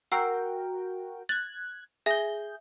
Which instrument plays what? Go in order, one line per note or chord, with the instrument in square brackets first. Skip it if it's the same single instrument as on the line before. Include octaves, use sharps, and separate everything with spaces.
[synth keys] F#4 A#4 G5 [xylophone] E6 C7
[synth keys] F#6 G#6 [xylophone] A6
[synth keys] G#4 G6 [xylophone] E5 A#6